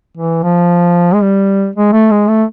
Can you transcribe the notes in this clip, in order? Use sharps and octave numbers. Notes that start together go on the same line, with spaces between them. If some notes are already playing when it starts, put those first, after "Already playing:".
E3
F3
G#3
G3
G#3
A3
G#3
A3